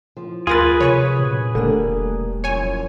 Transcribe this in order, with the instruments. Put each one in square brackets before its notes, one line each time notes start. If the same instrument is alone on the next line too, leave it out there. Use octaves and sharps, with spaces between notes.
[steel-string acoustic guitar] F3
[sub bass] D2 [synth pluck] F4 A#4 A6 [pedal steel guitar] G#4 B4
[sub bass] C3 [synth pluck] C#5 B5 C#6
[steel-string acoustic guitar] F#2 [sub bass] A#2
[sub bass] E1 [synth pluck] D3 [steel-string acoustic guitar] G3 A3 A#3
[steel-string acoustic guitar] F#2 F3 [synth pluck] C#5 G#5